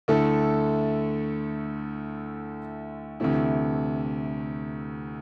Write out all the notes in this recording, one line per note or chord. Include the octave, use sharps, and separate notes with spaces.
D2 D3 A3 E4 A4
D2 C3 E3 A3 E4